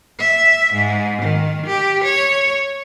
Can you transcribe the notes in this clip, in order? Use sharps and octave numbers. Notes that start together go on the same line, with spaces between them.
E5
G#2
D#3
G4
C#5